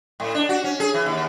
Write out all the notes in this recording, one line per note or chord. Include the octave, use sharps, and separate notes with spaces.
A2
D4
F#4
C#4
G#4
E3
D#2